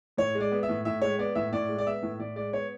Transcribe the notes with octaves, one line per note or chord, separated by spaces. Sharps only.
A2 C#5
G#3
D5
B3
E5
A2
A2 E5
G#3 C#5
B3 D5
A2 E5
A2 D5
G#3
D5
B3 E5
A2
A2 D5
G#3 D5
B3 C#5